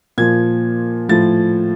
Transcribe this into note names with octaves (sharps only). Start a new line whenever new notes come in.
A#2 F3 G#6
A2 F3 A6